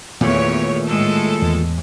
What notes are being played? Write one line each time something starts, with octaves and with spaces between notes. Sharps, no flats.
E2 A#2 D#3 A3 C#5
A2 G#3 A4
E2